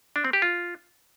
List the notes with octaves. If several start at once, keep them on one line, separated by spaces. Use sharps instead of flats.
D4
C4
G4
F4